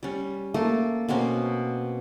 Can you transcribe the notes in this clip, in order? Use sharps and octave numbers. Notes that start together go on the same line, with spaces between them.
G3 C#4
A3 A#3 A4
B2 A#3 C4 C#4